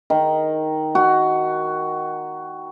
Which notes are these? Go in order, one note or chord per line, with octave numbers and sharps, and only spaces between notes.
D#3
F#4